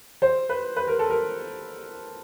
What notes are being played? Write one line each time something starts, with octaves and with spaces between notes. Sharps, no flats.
C5
B4
B4
A#4
A4
A#4